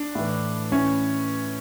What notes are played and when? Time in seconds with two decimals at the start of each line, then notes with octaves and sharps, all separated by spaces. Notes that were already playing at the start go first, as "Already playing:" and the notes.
Already playing: D4
0.15 A2 E3
0.72 A2 E3 C#4